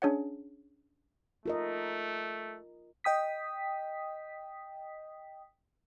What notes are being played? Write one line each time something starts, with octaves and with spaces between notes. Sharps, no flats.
C#4 D4 G#4 C#5 D#5 F#5
A3 F4 A#4 D#5
D#5 G5 D#6 B6